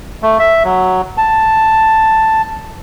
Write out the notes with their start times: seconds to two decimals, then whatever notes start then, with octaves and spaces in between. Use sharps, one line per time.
0.23 A3
0.39 E5
0.65 F#3
1.18 A5